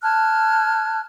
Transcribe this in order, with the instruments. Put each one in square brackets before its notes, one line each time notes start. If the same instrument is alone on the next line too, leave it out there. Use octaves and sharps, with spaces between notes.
[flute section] A5 F6 F#6 G#6